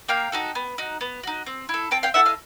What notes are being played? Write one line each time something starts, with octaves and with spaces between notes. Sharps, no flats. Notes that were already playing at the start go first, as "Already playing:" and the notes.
A#3 F5 G5
D#4 F#4 A4
B3
D#4 F#4
B3
D#4 F#4
C4
E4 A4
C4 G5 A5
F5 G5
E4 A4 E5 F#5
D#5 F5